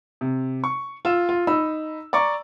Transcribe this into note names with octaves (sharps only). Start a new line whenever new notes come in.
C3
C#6
F4 E6 E7
F4
D#4 B5 E6
D5 A#5 C#6 D6